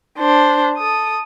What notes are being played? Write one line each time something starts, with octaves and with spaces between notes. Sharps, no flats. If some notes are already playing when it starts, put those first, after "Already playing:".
D4 C5
A4 D#6